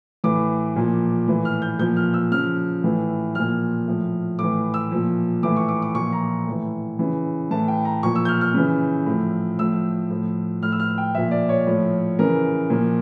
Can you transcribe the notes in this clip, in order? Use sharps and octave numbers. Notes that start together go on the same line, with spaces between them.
A2 E3 D6
A#2 F3
A2 E3
F6
G6
A#2 F3 G6
F6
E6
C#3 F3 F6
A2 E3
A#2 F3 F6
A2 F3
A2 E3 D6
E6
A#2 F3
A2 E3 D6
C#6
D6
D6
A#2 F3 C#6
A#5
A2 E3
C#3 E3
A2 E3 A5
G5
A#5
A#2 F3 C#6
E6
G6
F6
F6
C#3 E3
A2 F3
A2 F3 E6
A2 F3
A2 F3 F6
E6
F6
G5
A#2 F3 E5
D5
C#5
A2 F3
C#3 E3 A#4
A#2 F3